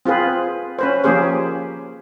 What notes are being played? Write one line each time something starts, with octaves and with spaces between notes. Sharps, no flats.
C4 F4 G#4 B4
C#4 B4 C5
F3 A#3 C#4 G4 G#4 C5